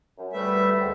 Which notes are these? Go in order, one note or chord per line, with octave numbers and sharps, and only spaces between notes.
F#2
D2 G3 A3 B4 E5
D2 D3 G#3 C4